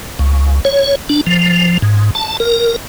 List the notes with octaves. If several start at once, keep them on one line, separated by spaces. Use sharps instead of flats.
C#2
C#5
D4
F3
G#2
A5
A#4